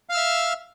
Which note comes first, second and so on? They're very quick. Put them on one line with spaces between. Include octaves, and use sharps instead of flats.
F5 F6 E6 E5